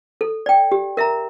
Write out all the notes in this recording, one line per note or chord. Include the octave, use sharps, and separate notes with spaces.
A4
D5 G5
G4
A#4 E5 A#5